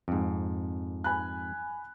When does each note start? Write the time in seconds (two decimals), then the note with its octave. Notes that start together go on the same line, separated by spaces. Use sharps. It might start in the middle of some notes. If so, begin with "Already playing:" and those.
0.08 F2 G#2
1.04 G#5 B5 F#6